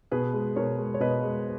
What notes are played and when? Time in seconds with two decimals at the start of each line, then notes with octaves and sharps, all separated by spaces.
0.11 B2 G#4 B4
0.33 G#3
0.56 B2 A#4 C#5
0.78 G#3
0.94 C#5
1.00 B2 B4 D#5
1.23 G#3